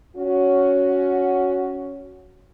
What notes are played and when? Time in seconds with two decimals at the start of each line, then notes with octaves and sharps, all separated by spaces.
0.17 C#4 F#4